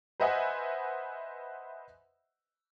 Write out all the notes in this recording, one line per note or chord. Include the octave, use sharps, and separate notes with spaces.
B4 C5 D#5 E5 F#5 G#5